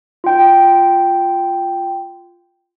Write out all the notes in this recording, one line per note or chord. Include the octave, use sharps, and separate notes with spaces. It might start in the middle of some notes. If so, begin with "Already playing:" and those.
F4 G5